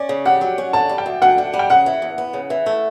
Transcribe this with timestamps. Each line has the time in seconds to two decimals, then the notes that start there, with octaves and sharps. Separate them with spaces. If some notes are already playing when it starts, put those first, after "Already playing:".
Already playing: C#4 D5
0.09 C#3
0.25 G4 F#5
0.41 F#3
0.58 C#4
0.73 D3 A5
0.89 G3
0.98 G5
1.06 D2
1.22 D2 F#5
1.38 D3
1.54 G3
1.59 G5
1.70 C#3 F#5
1.86 E3
2.02 E2
2.18 B3
2.34 C#3
2.50 E3
2.66 A3